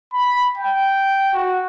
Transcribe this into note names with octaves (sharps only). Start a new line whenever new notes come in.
B5
G5
F#4